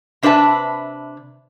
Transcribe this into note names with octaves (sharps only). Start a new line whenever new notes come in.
C3 D4 B4 C#5 E5 A5